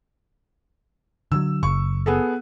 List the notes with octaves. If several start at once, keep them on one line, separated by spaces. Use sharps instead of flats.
D3 D#3 F#3 E6
F#1 C#6
B3 G#4 A4